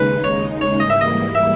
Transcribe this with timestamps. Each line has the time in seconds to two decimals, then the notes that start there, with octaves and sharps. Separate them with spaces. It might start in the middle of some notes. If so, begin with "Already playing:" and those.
Already playing: D#2 C#3 G#3 D#4 B4
0.24 C#5
0.61 C#5
0.80 G#2 E3 G3 A#3 E4 D#5
0.90 E5
1.01 D#5
1.35 E5